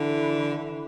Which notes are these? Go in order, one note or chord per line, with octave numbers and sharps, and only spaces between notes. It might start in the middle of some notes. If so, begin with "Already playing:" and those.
Already playing: D3 E3